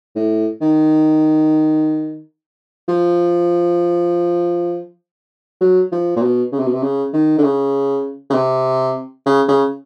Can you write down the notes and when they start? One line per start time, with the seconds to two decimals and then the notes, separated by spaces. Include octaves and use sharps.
0.15 A2
0.61 D#3
2.88 F3
5.61 F#3
5.92 F3
6.16 A#2
6.22 B2
6.52 C#3
6.59 C3
6.67 B2
6.73 C3
6.83 C#3
7.13 D#3
7.38 D3
7.44 C#3
8.30 C#3
8.34 C3
9.26 C#3
9.48 C#3